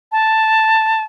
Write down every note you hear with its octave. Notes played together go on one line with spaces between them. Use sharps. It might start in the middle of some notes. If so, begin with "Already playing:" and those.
A5